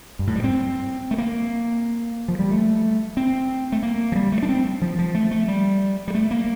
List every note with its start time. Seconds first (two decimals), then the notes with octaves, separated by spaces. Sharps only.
0.19 G2
0.27 A2
0.36 G3
0.44 C4
1.11 A3
1.18 A#3
2.28 F3
2.39 G3
2.51 A3
3.17 C4
3.72 A3
3.83 A#3
4.12 F3
4.15 G3
4.32 A3
4.43 D4
4.49 C4
4.82 F3
4.99 F3
5.15 A3
5.31 A3
5.48 G3
6.08 G3
6.15 A3
6.31 A#3